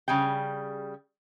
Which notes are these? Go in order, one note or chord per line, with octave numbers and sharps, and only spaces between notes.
C#3 G3 G#4 G5